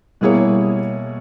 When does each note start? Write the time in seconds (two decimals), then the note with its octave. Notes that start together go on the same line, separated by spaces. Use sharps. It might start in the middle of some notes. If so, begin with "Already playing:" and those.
0.21 B2 G3 A#3 E4 G#4 C#5